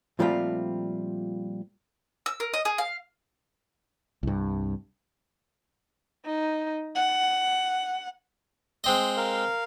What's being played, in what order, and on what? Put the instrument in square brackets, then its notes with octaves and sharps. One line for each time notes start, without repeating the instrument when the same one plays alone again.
[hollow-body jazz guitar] A#2 F3 G3 A3 C4 F4
[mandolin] E6
A#4
D#5
G#4
F5
[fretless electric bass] C2 G2
[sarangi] D#4
F#5
[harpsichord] G#3 C4 D#5
[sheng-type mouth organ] A#4 F5